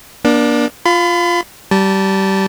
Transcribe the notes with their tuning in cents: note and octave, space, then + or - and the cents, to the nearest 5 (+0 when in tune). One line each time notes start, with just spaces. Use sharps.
A#3 +35 D4 +0
F4 +0 B5 +35
G3 -20 A5 +5